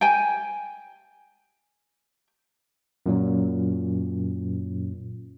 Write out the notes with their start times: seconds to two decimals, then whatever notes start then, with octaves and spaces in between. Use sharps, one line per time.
0.01 G5 G#5
3.06 F#2 A#2 F#3